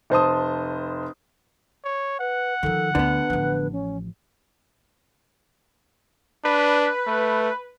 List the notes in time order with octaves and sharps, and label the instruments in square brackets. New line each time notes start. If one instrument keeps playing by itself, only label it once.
[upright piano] F1 C5 A5 D#6
[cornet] C#5
[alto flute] B4 [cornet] F#5
[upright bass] D#3 F3 [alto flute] A4
[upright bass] D2 [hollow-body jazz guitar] D3 B3 [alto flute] B4
[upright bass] A1 F3
[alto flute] C#4
[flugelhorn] D4 [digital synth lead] B4
[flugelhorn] A3